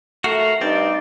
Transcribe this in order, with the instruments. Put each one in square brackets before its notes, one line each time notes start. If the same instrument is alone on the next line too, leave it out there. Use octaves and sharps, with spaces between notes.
[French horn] A3 [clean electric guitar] F#4 [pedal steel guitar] A#4 F5
[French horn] G2 [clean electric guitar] C4 [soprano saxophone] D#4 [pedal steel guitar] D5